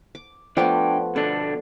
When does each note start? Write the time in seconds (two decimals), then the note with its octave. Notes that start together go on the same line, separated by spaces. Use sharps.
0.15 D6
0.57 F3 A3 B3 D4 D5 G5
1.16 B2 D3 D4 A4